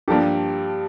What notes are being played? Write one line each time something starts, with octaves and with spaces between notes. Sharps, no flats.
G2 F3 A#3 D4 G4 A4